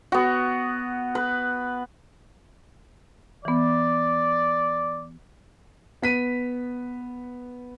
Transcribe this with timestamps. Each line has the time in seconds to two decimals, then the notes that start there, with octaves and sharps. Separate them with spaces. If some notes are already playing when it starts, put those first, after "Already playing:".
0.12 B3 F#4
1.15 B4
3.45 E3 B3 D5
6.02 B3 B6 D#7